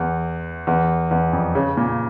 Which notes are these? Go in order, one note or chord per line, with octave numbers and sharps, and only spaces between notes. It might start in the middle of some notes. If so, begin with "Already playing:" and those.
Already playing: E2
E2
E2
F2
C#3
A#2